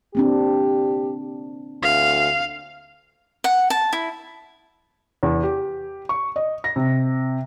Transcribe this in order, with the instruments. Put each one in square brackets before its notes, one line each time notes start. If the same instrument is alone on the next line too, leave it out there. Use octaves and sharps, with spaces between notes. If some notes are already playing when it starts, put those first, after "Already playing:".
[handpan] A#3 C4 D4 [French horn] G4
[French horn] D2 [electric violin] F5
[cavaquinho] F#5
A5
E4
[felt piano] E2
G4
C#6
D#5
A#6
C3